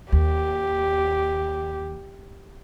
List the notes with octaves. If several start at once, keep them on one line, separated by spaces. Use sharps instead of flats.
D#2 G4